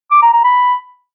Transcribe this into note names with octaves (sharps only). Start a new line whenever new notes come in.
D6
A#5
A#5
B5